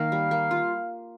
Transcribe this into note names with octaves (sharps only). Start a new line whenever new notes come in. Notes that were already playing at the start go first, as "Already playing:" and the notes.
Already playing: D#3 A#3 F5
G3
A#3
F4